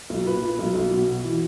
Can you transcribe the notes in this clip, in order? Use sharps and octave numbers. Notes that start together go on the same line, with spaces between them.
B1
A#2 B4
A#2
B1
B1
B2
B2
E3